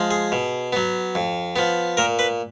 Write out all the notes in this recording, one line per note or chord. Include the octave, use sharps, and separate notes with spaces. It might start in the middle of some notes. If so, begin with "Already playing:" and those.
Already playing: F3 G#3
G#4
B2
F#3 B3
F2
F3 B3
A#2 A#4
B4